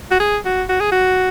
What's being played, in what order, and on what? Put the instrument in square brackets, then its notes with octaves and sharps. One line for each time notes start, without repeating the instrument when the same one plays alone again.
[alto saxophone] F#4
G#4
F#4
F#4
G#4
F#4